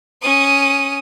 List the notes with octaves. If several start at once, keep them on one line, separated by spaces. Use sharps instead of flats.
C#4 D#6